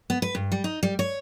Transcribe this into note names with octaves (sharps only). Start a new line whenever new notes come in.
B3
B4
G2
G3
D#4
G3
C#5